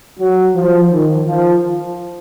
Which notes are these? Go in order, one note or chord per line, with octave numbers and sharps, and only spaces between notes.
F#3
F3
D#3
F3